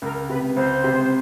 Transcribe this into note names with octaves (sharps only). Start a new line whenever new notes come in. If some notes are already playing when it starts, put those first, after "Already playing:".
C#2 A#4
C3 B4
C#2 C5
C3